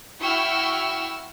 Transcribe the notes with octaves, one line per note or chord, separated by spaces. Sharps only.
E4 F#4 G5 C#6 E6 F6